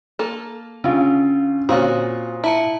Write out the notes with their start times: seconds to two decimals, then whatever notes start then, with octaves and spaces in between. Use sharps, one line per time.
0.19 A#3 A4 A#5
0.84 C#3 C#4 D4 F4
1.69 A#2 C4 C#4 F4 F#4 D#6
2.44 E4 A5 A#5 C#7